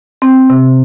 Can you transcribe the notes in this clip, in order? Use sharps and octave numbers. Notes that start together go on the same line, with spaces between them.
C4
C3